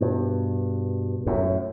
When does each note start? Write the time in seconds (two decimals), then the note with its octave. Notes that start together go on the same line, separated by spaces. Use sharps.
0.01 G2 B2
1.26 F#2 A2